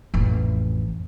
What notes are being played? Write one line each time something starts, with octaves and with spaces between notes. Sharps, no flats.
A1 F2